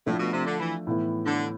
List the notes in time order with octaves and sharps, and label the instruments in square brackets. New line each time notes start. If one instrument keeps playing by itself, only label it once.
[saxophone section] A2 [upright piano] F3 A3 D4
[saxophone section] B2
C3
D3
E3
[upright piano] A2 E3 B3 E4
[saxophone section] D3